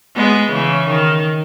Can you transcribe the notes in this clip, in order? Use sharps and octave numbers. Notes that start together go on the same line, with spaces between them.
G#3 B3
C#3 E3
D#3